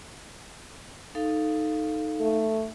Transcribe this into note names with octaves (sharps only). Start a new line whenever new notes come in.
D#4 A4 F5
A3